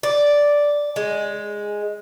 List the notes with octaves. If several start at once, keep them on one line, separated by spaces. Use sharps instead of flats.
D5
G#3